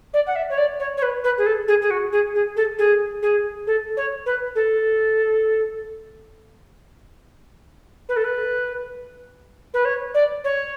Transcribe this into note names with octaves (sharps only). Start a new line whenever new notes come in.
D5
F#5
E5
C#5
D5
C#5
C#5
B4
B4
G#4
A4
G#4
G#4
F#4
G#4
G#4
A4
G#4
G#4
A4
C#5
B4
A4
B4
A4
B4
B4
C#5
D5
C#5